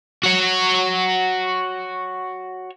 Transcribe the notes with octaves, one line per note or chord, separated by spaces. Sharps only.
F#4 C#5